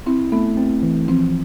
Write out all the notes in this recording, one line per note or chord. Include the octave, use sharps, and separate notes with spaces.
C4 E4
A3 B3
C4
E3
F3 C4